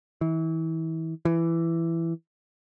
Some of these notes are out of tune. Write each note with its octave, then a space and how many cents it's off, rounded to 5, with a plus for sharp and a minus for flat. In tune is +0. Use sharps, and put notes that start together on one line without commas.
E3 -30
E3 +10